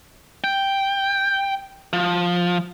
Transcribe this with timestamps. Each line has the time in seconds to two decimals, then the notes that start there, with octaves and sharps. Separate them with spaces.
0.44 G5
1.93 F3